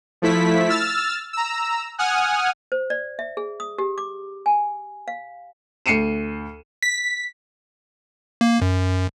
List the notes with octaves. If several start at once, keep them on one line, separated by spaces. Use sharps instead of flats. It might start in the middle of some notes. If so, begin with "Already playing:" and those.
F3 A3 E4 B6
E6 F6 A6
A#5 E6
F#5 G#5 D#6 F6
C5
D5
E5
G#4
D#6
G4
D6
G#5
F5
D2 C7 C#7 D#7 E7
B6
A#3
F#2